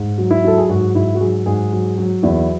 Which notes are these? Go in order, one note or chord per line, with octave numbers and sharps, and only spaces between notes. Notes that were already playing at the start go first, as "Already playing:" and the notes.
Already playing: G#2
F#3
E4
F#3 A4
G#4
G#2 F#4
G#2 E4
F#4
F#3 G#4
G#2 G#4
F#3
F#3
E2 E4